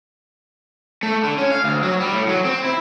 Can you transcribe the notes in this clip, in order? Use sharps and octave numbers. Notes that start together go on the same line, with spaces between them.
A3
D3
C#4
F5
D2
F#3
G3
A2
F#3
C4
E4